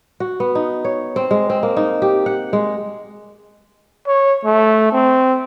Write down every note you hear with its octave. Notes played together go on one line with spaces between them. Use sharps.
F#4
B3
D#4
C#5
C4
G#3
C4
A#3
D#4
G4
F#5
G#3
C#5
A3
C4